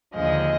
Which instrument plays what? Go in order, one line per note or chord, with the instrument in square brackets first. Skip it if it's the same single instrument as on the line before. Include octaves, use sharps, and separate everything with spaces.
[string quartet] D#2 D3 F3 G#3 D#5